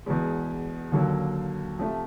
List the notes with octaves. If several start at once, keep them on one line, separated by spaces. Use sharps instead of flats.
E2 B2 G#3
D#2 D3 F#3 A#3
C3 F3 A3